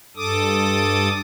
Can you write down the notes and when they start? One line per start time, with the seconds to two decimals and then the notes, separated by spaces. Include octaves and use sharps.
0.16 G2 A4 D6 D#6